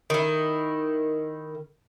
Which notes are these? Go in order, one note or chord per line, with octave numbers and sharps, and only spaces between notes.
D#3 E4